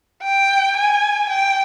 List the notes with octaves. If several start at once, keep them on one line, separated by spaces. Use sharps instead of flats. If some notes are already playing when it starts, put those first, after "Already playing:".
G5
G#5
G5